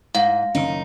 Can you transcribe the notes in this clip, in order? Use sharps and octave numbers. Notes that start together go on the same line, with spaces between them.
G#2 F5
F#1 D#3 C#4 D#4